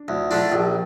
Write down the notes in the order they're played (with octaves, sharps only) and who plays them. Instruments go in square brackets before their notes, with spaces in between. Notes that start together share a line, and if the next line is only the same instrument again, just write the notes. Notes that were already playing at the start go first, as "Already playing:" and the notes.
Already playing: [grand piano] D4
[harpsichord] D2 [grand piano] E4
[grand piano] E4
[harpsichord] D3 A3 D4 [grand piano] F4
[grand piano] F4
[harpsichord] A#1 [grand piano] G4